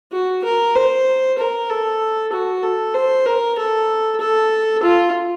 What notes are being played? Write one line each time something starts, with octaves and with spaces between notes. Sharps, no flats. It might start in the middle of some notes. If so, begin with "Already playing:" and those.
F#4
A#4
C5
A#4
A4
F#4
A4
C5
A#4
A4
A4
F4